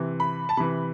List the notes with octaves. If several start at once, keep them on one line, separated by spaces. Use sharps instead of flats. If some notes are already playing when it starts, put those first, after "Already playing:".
Already playing: C3 E3
B5
A5
C3 E3 B5